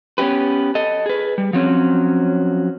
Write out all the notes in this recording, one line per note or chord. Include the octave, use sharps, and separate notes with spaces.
B3 C#4 D#4 G4 B4
A4 D#5
G#4 B4
G3
F3 F#3 C4 C#4